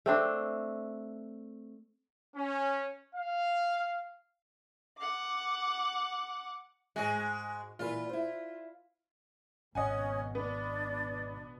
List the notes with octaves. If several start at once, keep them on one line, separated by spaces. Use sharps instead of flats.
A3 C4 D4
C#4
F5
F#5 D6
G#2 G#3 F#4 G#5
A#2 E3 F4 B4
E4 C5
G#1 B2 C#4 D#5 F#5 G#5
B3 D4